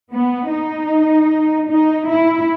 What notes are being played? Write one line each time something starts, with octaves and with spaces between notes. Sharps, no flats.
B3
D#4
D#4
E4